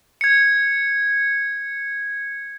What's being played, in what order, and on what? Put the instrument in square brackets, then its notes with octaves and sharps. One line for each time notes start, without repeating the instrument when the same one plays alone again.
[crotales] G#6 C#7